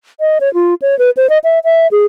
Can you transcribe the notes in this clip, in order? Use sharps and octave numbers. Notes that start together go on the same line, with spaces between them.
D#5
C#5
F4
C#5
B4
C5
D#5
E5
E5
G#4